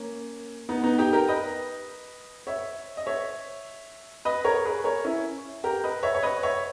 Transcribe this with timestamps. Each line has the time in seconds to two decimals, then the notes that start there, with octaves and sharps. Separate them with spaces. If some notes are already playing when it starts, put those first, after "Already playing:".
Already playing: A#3 C#4
0.69 B3 D#4
0.83 B3 D#4
0.98 D#4 G4
1.13 G4 A#4
1.28 B4 D#5
2.47 C#5 E5
2.97 D#5
3.06 C#5 E5
4.25 B4 D#5
4.45 A#4 C#5
4.65 G#4 B4
4.84 A#4 C#5
5.04 C#4 E4
5.64 G4 A#4
5.84 B4 D#5
6.03 C#5 E5
6.14 C#5
6.23 B4 D#5
6.43 C#5 E5